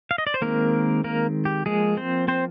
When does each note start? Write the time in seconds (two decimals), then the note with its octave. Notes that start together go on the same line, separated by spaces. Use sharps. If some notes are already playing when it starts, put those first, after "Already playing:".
0.11 F5
0.18 D#5
0.27 D5
0.34 C5
0.42 D#3 G#3 A#3 C4 A#4
1.04 A#3 A#4
1.45 G4
1.66 F3 G#3 A#3 G#4
1.97 C4 C5
2.28 C4 C5